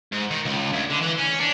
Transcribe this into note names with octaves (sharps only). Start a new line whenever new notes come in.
G#2
D#3
C#2
D2
D3
E3
C#4
D4